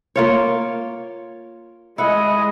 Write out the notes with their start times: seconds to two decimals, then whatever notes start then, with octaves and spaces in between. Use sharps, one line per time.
0.16 A#3 F4 C#5
1.98 G#3 E4 D#5 F#5